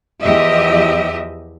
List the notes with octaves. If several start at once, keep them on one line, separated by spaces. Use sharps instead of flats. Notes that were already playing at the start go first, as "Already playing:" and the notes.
E2 F3 G4 D#5 E5